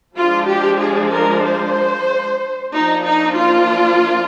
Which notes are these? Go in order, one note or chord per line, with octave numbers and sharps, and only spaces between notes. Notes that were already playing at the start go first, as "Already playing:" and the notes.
F3 G#3 D4 F4
G4
G#4
A#4
C5
F3 A#3 D4 D#4
D#4
F4